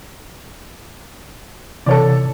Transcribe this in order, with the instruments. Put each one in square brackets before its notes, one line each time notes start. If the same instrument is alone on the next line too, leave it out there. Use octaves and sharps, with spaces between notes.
[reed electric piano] C3 E3 [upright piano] A4 C#5 D5